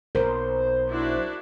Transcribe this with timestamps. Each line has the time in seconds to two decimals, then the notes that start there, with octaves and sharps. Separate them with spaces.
0.15 B1 A#4 C5
0.89 D4 E4 F#4